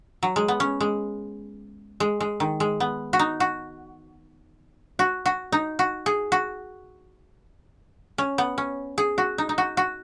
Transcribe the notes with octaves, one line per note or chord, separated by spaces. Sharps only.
F#3
G#3
B3
C#4
G#3
G#3
G#3
D#3
G#3
B3
F#4
D#4
F#4
F#4
F#4
D#4
F#4
G#4
F#4
C#4
B3
C#4
G#4
F#4
D#4
D#4
F#4
F#4